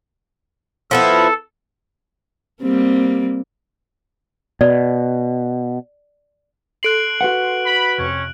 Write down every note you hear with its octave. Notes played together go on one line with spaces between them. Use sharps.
F3 B3 E4 A4
G3 A#3 C4
B2 D5
A4 C6 F#6 C7 D7 F#7
F#4 B4 F#5
B5
F2 C3 C#4 C#5